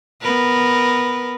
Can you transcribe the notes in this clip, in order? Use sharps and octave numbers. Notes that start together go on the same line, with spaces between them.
B3 A#4 B4